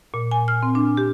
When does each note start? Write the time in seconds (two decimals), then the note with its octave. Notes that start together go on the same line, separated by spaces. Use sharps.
0.14 A#2
0.31 G#5
0.48 F6
0.63 C4
0.75 D4
0.97 G4